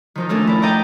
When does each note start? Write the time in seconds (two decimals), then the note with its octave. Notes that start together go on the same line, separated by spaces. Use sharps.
0.15 D#3 F3 D#4
0.29 A3 C#4 D4 A4 A#4
0.47 E4 A4 D5
0.62 D5 D#5 G5 A#5 D6